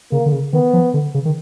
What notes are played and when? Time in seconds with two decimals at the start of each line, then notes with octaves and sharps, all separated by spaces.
0.12 C#3 A#3
0.26 D3
0.32 C#3
0.53 D#3 B3
0.73 F3
0.94 D3
1.14 C#3
1.25 D#3